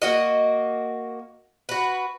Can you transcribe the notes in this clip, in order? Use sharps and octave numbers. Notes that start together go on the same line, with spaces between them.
A#3 F#4 D#5
F#4 B4